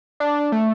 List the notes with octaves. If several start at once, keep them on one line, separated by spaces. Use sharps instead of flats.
D4
A3